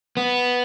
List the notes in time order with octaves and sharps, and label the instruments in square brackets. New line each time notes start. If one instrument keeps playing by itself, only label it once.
[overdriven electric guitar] B3